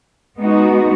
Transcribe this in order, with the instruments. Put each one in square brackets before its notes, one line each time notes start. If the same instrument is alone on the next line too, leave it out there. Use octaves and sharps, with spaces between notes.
[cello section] G#3 B3 D#4 F#4